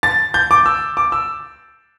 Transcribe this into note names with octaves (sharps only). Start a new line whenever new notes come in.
A6
G6
D6
E6
D6
E6